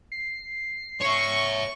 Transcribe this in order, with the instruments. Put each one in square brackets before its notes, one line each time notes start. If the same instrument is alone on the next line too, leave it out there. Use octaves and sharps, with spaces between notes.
[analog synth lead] C7
[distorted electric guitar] C#5 E5 [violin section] C#6